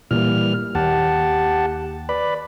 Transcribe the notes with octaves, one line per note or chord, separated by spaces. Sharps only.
A#2 E3 G3 A#3 F6
D#2 G4 F#5 A5
B4 D5 B5